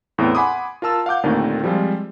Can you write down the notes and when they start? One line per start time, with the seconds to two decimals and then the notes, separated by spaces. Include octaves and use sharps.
0.18 E2 A2 B3 C4
0.35 F#5 G#5 B5 C6 D6 D#6
0.82 F4 A#4 A5 E6
1.06 F5 F#5 D6 G6
1.23 D#2 A#2 D3 D#3 A3 C4
1.64 F3 G3 G#3 C4 F4